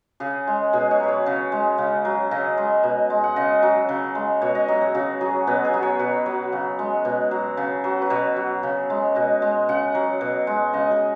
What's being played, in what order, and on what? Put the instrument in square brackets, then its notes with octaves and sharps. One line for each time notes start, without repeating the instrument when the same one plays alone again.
[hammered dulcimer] C#3 G#4
G#3
B2 G#4
C#5
F#3 B4
C#5
C#3
G#3
C#3
F#3
C#3 D#5
G#3
B2
G#3
F#5
C#3 D#5
F#3
C#3
G#3
B2 C#5
D#5
F#3 C#5
G#4
C#3 F#4
F#3 G#4
B2 B3
G#4
F#3
C#5
B2 B4
F#3
C#3
G#3
B2
F#3
C#3
F#3
B4
B2 C#5
F#3
C#3
G#3
B2 D#5
G#3
C#3 F#5
F#3
B2
G#3
C#3 D#5
G#4